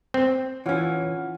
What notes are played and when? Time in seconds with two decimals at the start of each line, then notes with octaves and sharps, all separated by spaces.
0.14 C4
0.66 E3 C#4 F4 C#5 F#5 F6